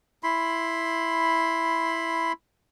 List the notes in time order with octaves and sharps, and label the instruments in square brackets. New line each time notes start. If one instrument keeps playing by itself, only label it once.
[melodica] E4 B5 C6